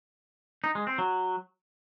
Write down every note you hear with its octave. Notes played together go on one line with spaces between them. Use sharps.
D#4
G#3
C4
F#3